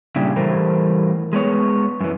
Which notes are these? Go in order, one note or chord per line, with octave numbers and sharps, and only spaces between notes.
A#2 C#3 G3 D4 E4 G4
A2 E3 G3 A#4 C5
G#3 B3 C#5
F#2 E3